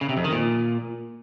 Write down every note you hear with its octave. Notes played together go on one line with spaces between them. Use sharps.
C#3
C3
F2
D#3
A#2